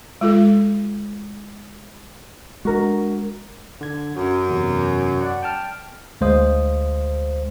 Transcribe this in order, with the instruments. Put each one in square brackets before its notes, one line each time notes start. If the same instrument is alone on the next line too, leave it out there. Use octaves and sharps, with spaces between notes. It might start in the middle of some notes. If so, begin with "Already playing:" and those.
[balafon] G#3 F4 A4
[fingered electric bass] G#3 D4 [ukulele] F#4 A#4
[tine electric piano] D3 G#6
[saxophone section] F#2 [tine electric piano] F#4
[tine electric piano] E2 C3
D5 F#5
G5 A5 F6
D2 G#3 C5 F5 D#6